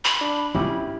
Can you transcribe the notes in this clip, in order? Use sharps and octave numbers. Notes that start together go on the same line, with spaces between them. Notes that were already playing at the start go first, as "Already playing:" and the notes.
B5
D4
C#4 E4 F4 G4